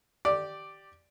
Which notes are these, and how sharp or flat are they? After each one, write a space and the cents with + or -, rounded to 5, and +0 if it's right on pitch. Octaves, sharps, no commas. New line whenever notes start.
G4 -10 D5 +5